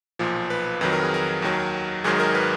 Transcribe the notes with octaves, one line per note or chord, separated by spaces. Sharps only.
B1 A#2 F3
B4
F2 D#3 F#3 B4
A#4
G#4
A#4
D#2 D#3 F#3
G#1 G#2 D#3 F#3 G#4
A#4
B4